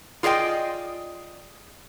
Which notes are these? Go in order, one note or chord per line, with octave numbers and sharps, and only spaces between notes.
F4 G#4 D5 D#5 G5